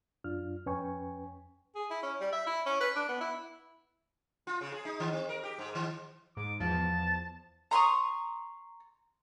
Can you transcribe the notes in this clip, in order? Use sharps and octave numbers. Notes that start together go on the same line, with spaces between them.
F#2 D4 F4 F6
F2 C#4 B4 G5 G#5 C#6
G#4
E4
C#4
G3
E5
E4
C#4
B4
D4
B3
E4
F4
C#3
G#4
D#4
D#3
C4
A#4
G4
G#2
D#3
G#2 D6
E2 F3 A5
A#5 C6 C#6 D#6